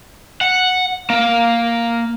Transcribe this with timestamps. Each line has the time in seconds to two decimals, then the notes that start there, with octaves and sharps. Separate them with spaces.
0.41 F#5
1.10 A#3